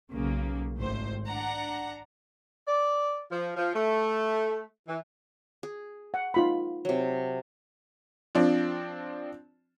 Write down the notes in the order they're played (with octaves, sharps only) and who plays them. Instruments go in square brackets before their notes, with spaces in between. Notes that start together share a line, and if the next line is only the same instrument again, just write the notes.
[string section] B1 C#3 A#3
G#1 A2 C5
D4 F#5 A#5
[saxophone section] D5
F3
F3
A3
E3
[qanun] G#4
[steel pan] F#5
D#4 F4 B5
[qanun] C3 F#3
[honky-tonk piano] F3 C4 D4